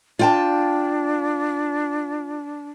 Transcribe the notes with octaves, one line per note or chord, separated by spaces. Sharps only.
D4 F4 G5 A5